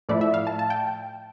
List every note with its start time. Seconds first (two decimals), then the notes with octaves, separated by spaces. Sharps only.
0.09 A2 F3 A3 E4 D5
0.21 E5
0.34 F5
0.47 A5
0.59 A5
0.70 G5